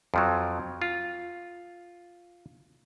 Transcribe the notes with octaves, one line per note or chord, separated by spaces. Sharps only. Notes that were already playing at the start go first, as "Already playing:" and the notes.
F2 F3 F#3
F4